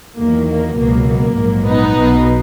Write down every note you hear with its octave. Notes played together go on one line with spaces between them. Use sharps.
E2 D#3 F#3 A#3
A#3
C#2 B2 F#3 A#3
A#3
A#1 G#2 F#3
B3 D#4
B1 B2 F#3